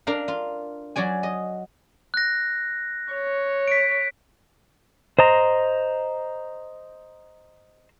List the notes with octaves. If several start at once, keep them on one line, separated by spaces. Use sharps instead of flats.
D4 A#4 F5
F4
F#3 F#4 D5 G#5
D#5
F#6 A#6
C#5
B6 D7
C5 D#5 A#5